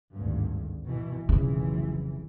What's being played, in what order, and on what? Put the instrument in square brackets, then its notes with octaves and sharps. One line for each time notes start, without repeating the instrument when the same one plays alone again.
[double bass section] G#1 D2 G2
B2 E3
[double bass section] F1 B1 E3 [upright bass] C#3